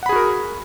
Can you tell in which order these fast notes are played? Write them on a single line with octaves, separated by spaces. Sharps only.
F#5 B5 G#4 F#4 A#4